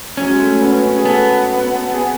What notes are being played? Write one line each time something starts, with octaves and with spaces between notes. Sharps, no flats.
F#3 C#4
G#3
A3
B3
C#4
G#4
B3 A4
G#4